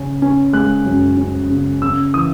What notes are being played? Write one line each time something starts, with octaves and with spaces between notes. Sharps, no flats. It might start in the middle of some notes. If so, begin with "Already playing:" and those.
Already playing: C#3 C#4
C#4
G#3 F#6
F#2
C#4
C#3
C#3 E6
E3 D#6